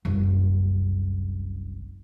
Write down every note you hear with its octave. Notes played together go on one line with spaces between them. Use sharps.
F#1 C2